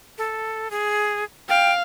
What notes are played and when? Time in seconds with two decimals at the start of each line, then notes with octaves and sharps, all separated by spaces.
0.18 A4
0.71 G#4
1.49 F5 G5